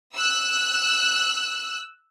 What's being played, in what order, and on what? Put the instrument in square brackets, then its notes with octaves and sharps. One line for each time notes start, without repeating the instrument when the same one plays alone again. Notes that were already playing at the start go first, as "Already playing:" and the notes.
[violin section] E6 F#6